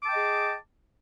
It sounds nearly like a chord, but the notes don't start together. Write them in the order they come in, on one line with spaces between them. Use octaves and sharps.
D6 A5 G5 D#5 G#4